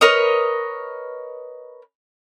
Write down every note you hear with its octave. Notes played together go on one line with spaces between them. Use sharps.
A#4 B4 C#5 D#5